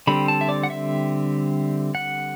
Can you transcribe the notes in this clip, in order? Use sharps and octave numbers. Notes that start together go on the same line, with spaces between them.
D3 G3 C4 B5
A5
E5
D5
F#5
E5
F#5